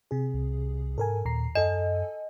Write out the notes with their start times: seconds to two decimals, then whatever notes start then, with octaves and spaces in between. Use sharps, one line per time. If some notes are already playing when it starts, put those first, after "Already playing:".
0.11 C3 G#4
0.34 C2
0.98 G#2 A4 A#4 G#5
1.25 D#2 A#2 A#5 C7
1.55 F#2 A4 D#5 G#5